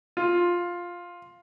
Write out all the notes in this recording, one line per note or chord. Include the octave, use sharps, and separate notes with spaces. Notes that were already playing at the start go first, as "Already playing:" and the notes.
F4